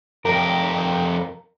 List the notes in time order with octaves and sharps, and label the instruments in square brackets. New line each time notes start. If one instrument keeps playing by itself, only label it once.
[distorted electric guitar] F2 G4 [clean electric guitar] A#4